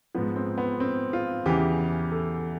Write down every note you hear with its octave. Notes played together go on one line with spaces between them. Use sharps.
G#2 F3 B3
C4
B3
C4
F4
E2 C#3 E3 G4
A4